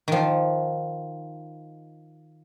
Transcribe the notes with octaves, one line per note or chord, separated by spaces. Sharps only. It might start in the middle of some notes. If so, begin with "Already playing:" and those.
D#3 F3